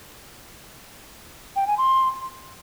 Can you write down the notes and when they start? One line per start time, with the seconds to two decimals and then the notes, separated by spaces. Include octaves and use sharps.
1.56 G5
1.67 G#5
1.78 C6